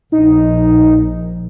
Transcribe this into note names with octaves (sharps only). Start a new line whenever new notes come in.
A#1 D#4